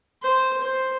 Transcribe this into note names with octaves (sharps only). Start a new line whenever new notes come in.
C5
C5